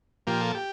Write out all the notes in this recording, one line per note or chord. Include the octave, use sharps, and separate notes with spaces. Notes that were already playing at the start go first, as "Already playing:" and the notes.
A#2 F3 A#3 G4
A4
G4